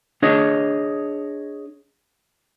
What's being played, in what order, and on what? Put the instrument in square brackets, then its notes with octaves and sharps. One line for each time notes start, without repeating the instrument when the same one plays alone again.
[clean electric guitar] D4 G#4 C#5 D#5